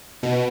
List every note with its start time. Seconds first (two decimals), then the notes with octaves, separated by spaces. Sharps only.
0.23 B2